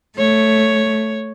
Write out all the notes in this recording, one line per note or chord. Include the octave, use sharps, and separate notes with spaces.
A3 C#5